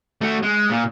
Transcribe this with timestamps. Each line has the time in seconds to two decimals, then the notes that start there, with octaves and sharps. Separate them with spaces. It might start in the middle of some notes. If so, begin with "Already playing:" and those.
0.21 A3 F#4
0.43 G#3
0.70 A#2